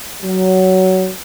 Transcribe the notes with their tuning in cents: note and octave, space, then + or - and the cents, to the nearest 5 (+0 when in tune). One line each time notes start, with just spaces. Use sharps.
F#3 +15